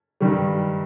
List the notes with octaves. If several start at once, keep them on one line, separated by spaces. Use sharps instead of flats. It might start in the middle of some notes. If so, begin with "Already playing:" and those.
G2 D#3 G3